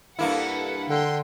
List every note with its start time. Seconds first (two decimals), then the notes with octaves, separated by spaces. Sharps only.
0.19 G2 A#3 E4 A4 B4 F#5
0.89 D3 G5 C6